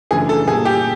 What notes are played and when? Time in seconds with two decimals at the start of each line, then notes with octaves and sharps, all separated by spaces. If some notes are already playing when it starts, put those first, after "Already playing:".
0.11 F#2 C#3 E3 A3 D4 G#4
0.29 A4
0.47 A#2 G3 A#3 G#4
0.65 G4